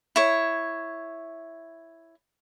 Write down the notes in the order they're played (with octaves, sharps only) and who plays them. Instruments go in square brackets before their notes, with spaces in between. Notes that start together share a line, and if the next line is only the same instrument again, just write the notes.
[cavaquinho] E4 C#5